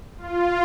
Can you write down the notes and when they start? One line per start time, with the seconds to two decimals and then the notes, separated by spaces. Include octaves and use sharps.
0.18 F4